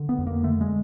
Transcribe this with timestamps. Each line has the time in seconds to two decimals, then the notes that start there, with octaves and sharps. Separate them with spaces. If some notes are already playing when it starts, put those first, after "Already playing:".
Already playing: D3
0.09 B3
0.19 F2
0.27 A#3
0.44 D3 A3
0.61 G#3